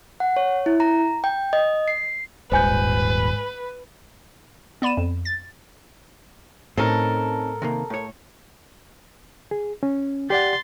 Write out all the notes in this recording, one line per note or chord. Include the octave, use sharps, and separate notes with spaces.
F#5
C#5
E4
A#5
G5
D#5
C7
D#1 A1 G#2 B4 C5 G#5 G6
B3 D5 B5 D#7 E7
F2
A6
A2 C4 C#4 D#4 A4 A#4
C3 D#3 A#3
A2 C#5
G#4
C#4
G4 D5 F#5 C6 A6